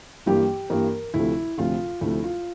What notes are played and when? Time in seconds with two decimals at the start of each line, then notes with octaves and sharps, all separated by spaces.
0.26 G2 E3 G3 A#3 G4
0.70 G2 E3 G3 A#3 A#4
1.14 D2 C3 F3 A3 E4
1.57 D2 C3 F3 A3 F4
2.01 D2 C3 F3 A3 E4
2.24 F4